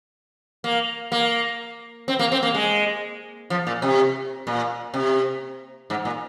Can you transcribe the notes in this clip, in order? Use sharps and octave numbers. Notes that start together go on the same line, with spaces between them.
A#3
A#3
C4
A#3
C4
A#3
G#3
F3
A#2
C3
A#2
C3
G#2
A#2